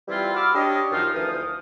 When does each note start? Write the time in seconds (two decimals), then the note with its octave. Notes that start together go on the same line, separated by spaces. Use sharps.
0.08 E3 G3 C4 E4 F4
0.34 F#4 B5 D6 E6 F6
0.55 D4 G4 C#5 D#5
0.92 F#2 D#3 F3 D#4 F4
1.14 D2 E3 F3 D#6